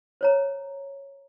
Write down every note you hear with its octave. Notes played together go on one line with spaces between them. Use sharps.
C5 C#5 A#5